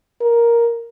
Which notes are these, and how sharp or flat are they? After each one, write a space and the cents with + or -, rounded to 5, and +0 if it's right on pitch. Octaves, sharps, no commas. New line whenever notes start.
A#4 +5